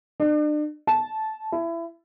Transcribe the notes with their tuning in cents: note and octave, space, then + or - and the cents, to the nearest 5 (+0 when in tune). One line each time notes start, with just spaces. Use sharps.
D4 +40
A5 -15
E4 +25